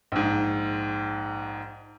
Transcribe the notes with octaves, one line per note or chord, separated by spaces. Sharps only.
A#1 G#2